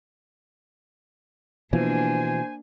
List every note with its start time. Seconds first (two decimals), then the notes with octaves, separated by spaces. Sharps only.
1.73 B2 E3 F3 A#3 D4 C5 G#5